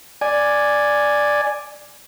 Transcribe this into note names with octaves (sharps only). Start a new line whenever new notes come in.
D5 G#5